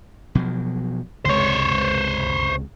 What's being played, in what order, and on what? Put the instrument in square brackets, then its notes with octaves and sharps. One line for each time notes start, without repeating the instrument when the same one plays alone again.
[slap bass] B2 F3 F#3
[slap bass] C#2 C3 G#3 [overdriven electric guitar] C5 C#5